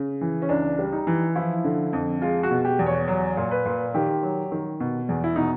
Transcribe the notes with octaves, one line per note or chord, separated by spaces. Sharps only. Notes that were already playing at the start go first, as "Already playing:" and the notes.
Already playing: C#3
E3
C#4
C#2 D4
G3
D#4
E3
F3 E4
D3
F2
G#3 F4
F#4
B2
G4
E2
C#5
F#3
A#2
B4
A#2
D#3 G4
F#3
D#3
B2
E2
E4
B2 D#4